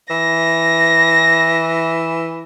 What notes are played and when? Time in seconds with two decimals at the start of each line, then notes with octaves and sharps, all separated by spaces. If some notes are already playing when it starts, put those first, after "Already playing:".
0.10 E3 A#6